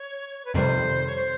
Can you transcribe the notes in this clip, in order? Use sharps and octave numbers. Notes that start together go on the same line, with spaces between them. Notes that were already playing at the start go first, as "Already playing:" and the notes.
Already playing: C#5
B4
F2 C3 D#3 G3 C5
C#5
C5